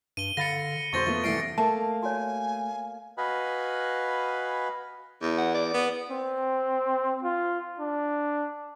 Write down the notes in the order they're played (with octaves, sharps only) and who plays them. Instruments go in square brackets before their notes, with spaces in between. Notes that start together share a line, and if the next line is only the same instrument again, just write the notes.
[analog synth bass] G2 [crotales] D#7 G7
[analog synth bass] D3 [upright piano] F5 B5 A6 [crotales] A#6 C#7
[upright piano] E1 C5 C6 [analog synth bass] F2 [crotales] C#6 A6 A#6
[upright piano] F3 A3 B3 [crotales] A#6
[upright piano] C2 E3 A3 [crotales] A#6 C7 D7
[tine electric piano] A3 [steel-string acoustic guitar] A#3 [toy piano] A5
[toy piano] F#4 C#5 [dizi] G#5
[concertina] F#4 B4 D#5 F5 G#5 B5
[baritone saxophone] E2
[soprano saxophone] F#5
D5
[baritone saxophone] B3
[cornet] C4
F4
D4